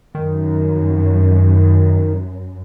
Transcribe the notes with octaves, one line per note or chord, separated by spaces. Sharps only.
F#2 D#3